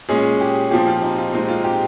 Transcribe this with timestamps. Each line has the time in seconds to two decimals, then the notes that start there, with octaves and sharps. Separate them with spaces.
0.09 A#2 G#3 C#4 G#4
0.41 G4
0.71 A#2 F3 C4 G4
0.87 F4
1.02 D#4
1.18 F4
1.33 A#2 G#3 C4 D#4
1.48 F4
1.64 G4